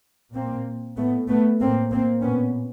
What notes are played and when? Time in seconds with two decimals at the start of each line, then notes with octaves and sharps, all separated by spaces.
0.34 A#2 A#3 C4
0.97 A2 A3 B3
1.29 A3 B3
1.60 A2 A#3 C4
1.92 A#3 C4
2.23 A#2 B3 C#4